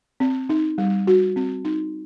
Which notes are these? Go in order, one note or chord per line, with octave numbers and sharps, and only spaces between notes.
C4
D#4
G3
F#4
C4
D#4